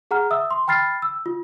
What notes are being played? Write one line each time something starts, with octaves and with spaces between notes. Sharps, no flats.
G#4 F#5 A#5 F6
E5 D#6 E6
C6
G5 B5 F6 A6 C7
E6
F4